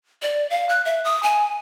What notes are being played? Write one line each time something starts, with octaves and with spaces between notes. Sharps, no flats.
D5
F5
F#6
E5
D#6
G#5